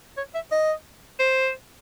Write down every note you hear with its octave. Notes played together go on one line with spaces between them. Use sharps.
C#5
E5
D#5
C5